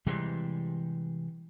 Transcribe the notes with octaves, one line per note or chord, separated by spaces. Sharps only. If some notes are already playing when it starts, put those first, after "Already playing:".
C3 E3 G3 G#3